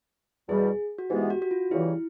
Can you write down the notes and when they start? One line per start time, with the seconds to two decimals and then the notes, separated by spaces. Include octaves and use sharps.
0.48 E2 B2 G3 G#4
0.99 F#4
1.10 G#2 E3 G#3 B3 G4
1.30 F#4
1.42 F#4
1.51 F4
1.71 E2 C#3 E3 G3 E4